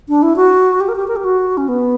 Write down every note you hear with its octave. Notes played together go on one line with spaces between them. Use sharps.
D4
E4
F#4
G4
A#4
G4
A#4
G4
F#4
C#4
B3